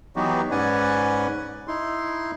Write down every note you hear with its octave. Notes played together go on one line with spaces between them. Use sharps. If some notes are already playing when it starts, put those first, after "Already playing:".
E3 F#3 B3 D#4 F#4 G4
G#2 C#4 B4 D5 F#5 G#5
D#4 E4 C6